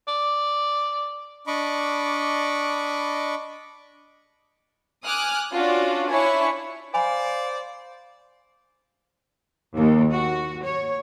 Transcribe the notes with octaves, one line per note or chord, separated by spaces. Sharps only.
D5
D4 D#5 B5 C#6 D6
G#5 D6 D#6 F6 F#6
C#4 D4 F4 F#4 D5
D4 E4 C#5 E5 G#5 C#6
C5 D5 F5 G#5 B5
D#2
F#4
C#5